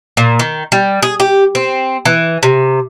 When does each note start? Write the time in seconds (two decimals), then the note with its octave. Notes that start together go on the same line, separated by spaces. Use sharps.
0.17 A#2
0.39 D#3
0.72 G3
1.03 G#4
1.20 G4
1.55 C4
2.05 E3
2.43 C3